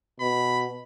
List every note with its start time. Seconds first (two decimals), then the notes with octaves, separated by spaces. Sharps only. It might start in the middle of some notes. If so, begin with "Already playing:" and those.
0.20 B2 B5